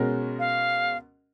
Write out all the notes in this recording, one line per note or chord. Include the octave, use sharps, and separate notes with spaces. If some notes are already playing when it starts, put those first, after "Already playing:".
Already playing: B2 G#3 C#4 F#4 A#4
F5